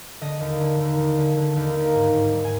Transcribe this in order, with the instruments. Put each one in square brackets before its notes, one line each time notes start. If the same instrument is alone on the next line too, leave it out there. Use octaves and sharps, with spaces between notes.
[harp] D3 D#5
D#2
D3
D#2
D#2
D3
D3
D#2
A#3
G#2
G#2
G3
G#5